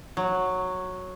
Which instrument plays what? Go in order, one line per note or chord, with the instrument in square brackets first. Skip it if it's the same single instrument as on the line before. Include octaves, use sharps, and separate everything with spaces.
[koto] F#3